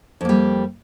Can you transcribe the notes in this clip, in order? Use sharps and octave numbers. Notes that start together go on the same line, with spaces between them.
F2 G3 A#3